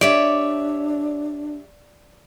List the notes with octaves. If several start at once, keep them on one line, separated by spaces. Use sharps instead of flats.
D4 G4 C#5 D5 E5